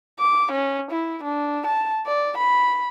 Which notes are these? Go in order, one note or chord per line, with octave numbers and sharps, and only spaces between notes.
D6
C#4
E4
D4
A5
D5
B5